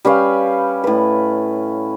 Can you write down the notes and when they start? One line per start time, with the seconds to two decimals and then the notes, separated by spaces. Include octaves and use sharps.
0.05 G3 C#4 B4 F5
0.84 A2 B4